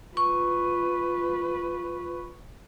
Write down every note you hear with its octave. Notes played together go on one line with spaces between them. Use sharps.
F4 B4 C#6